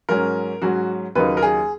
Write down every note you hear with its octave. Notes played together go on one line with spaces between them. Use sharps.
G#2 F#3 C#4 A#4
G#2 F#3 C#4 F#4
D#2 C#3 F#3 A#3 D#4 B4
A#4
G#4